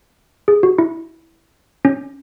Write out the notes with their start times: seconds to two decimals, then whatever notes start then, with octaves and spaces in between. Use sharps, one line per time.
0.48 G#4
0.63 F#4
0.78 E4
1.85 C#4